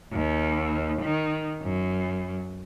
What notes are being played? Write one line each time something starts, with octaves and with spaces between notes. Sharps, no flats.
D#2
D#3
F#2